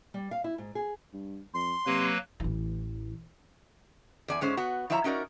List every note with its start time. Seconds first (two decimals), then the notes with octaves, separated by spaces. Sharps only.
0.14 G3
0.31 F5
0.44 E4
0.58 G#2
0.75 G#4
1.13 G2
1.54 F2 C6
1.86 C3 F#3 A#3 B4
2.40 A1 E3
4.28 E2 D5 G#5
4.41 G#2 G#3 C#4 C5
4.57 B3 F#4
4.90 F3 E4 C#5 E5 F5 A#5
5.04 C#4 D#4 F#4 A#4 D5